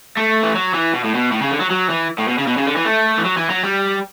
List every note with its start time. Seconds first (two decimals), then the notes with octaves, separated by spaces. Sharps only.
0.17 A3
0.43 E3
0.55 F#3
0.74 E3
0.93 B2
1.04 A2
1.15 B2
1.32 A2
1.42 C#3
1.51 D3
1.60 F#3
1.71 F#3
1.90 E3
2.18 A2
2.28 B2
2.38 C#3
2.47 B2
2.57 C#3
2.66 D3
2.76 E3
2.85 A3
3.18 E3
3.24 F#3
3.37 E3
3.50 F#3
3.63 G3